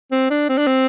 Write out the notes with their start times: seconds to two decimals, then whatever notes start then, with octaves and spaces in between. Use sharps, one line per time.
0.12 C4
0.31 D4
0.49 C4
0.58 D4
0.67 C4